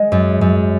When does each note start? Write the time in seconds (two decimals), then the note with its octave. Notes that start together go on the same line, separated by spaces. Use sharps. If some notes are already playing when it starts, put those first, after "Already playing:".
Already playing: G#3
0.12 F#2
0.41 F#2